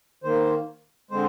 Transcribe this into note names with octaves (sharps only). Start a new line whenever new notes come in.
D#3 A#3 C5
D3 G#3 C4 C5